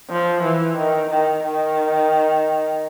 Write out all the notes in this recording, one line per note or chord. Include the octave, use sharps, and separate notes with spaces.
F3
E3
D#3
D#3
D#3